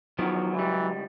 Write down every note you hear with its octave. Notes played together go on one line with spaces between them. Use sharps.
D#3 F3 F#3 B3
C#2 E3 G3